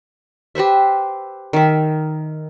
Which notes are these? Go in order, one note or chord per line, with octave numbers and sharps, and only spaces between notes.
G4 B4 C5 E5
D#3 E5